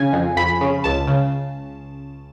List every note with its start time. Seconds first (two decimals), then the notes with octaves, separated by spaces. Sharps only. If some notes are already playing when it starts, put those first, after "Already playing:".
Already playing: C#3 G#5
0.13 F2
0.36 F2 B5
0.61 C#3
0.84 C#2 A5
1.07 C#3